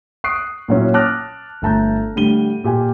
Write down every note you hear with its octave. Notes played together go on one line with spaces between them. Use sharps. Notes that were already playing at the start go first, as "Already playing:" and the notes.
C#6 D#6 F#6 C7 D7
A#2 F#3 C#4 E4
A5 D6 D#6 F6 F#6 A#6
G1 A3 A5 A#5 G6
A2 D3 G3 D#7 G7
A#2 G4 G#5